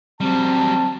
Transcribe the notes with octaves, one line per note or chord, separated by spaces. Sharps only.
F#3 G3 C4 A5